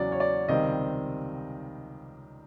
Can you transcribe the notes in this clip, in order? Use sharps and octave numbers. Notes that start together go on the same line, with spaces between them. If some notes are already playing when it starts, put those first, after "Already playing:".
Already playing: E2 C#3 F#3 D5
C#5
D5
C#2 C3 D#3 G3 C4 D#5